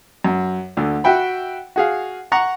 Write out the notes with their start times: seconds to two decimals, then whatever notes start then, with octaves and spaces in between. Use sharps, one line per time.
0.24 F#2
0.77 D2 D3
1.04 F#4 E5 G5 B5
1.76 F#4 G#4 F5
2.32 F#5 A#5 C#6